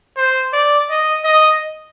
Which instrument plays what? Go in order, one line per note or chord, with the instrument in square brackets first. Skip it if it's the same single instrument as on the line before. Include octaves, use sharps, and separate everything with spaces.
[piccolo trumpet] C5
D5
D#5
D#5